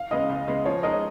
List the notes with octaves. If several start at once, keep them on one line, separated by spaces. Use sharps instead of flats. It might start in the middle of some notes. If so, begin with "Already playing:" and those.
Already playing: F5
C#3 G#3 B3 D#5
C#2
C#3 G#3 B3
F3 C#5
G#3 D#4 A#4 D#5